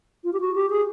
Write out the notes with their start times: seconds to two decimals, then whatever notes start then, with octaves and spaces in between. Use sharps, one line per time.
0.24 F4
0.33 G4
0.40 F#4
0.55 G4
0.70 G#4